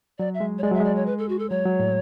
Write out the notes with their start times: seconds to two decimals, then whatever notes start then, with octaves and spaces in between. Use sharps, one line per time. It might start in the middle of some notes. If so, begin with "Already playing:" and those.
0.19 F#3 D5
0.34 E5
0.40 G#3
0.58 C#5
0.63 G#3 D5
0.71 F#3 E5
0.80 G#3 D5
0.96 C#5
1.06 B4
1.18 A4
1.29 F#4
1.39 A4
1.50 F#3 C#5
1.66 F#3
1.79 A2